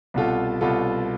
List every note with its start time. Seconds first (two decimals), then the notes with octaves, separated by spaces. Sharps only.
0.14 C2 B2 B3 F4 A4
0.61 C2 B2 B3 F4 A4